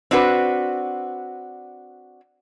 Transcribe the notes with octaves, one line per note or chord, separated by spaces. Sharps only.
C4 D4 F#4 B4